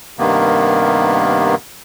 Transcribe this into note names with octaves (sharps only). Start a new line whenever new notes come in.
G2 C3 D#3 A#3 B3